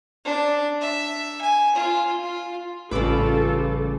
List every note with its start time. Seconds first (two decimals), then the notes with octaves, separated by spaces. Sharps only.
0.25 D4
0.81 E5
1.41 G#5
1.75 F4
2.23 F4
2.91 A1 C#3 G3 F4 A4 B4 D6